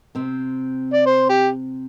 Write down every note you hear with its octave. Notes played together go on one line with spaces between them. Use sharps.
C3 C4
D5
C5
G4